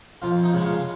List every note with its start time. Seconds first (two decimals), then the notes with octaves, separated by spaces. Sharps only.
0.22 F2 F4
0.44 D#4
0.54 C#3 G#3
0.65 F4